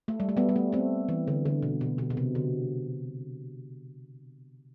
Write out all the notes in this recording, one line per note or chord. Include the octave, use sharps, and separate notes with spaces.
A3
G3
A3
G3 B3
G3
A3
A3 C4
E3
D3
D3
B2
B2
B2
B2
C3
D3